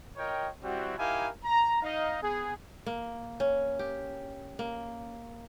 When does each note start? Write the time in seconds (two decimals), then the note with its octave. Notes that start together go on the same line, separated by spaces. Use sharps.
0.16 F4 A#4 C#5 D#5 G5
0.63 G3 C4 E4 F#4
0.97 D#4 E4 G4 A#4 F5 G#5
1.44 A#5
1.82 D#4 D#5 F5
2.21 B3 G#4
2.86 A#3
3.40 C#4
3.79 G4
4.59 A#3